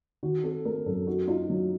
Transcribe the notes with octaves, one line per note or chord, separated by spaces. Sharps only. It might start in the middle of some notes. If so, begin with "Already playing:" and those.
D#3 F#4
C4 A4
A3 A#4
F#2 A4
D#4 F#4
D#4 F4
F#3